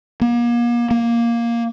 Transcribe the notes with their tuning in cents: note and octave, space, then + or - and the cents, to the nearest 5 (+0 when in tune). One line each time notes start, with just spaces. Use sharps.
A#3 +35
A#3 +5